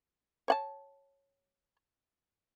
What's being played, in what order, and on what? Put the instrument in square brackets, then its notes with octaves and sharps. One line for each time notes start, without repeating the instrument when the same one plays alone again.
[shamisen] C#5 F#5 A5